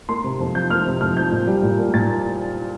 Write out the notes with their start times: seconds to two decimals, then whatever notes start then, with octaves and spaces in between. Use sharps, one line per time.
0.09 A#3 C6
0.24 C3
0.40 F2
0.55 F3 G6
0.70 A#3 F6
0.86 C3
1.01 F2 F6
1.17 F3 G6
1.31 A#2
1.47 G3
1.63 A#2
1.78 A#3
1.94 A#2 A6